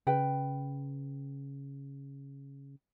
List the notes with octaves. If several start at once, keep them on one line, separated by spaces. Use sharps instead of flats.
C#3 B4 G5